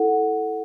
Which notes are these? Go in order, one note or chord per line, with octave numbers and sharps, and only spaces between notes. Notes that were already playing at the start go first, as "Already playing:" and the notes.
Already playing: E4 A4 F#5